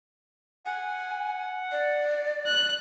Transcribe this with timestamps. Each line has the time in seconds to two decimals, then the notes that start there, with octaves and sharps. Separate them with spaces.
0.66 F#5 G#5
1.72 D5
2.46 F#6